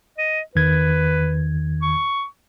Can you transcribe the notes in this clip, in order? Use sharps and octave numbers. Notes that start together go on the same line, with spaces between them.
D#5
E2 D#3 B4 G#6
C#6